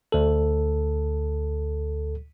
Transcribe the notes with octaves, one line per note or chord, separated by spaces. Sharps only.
D2 A4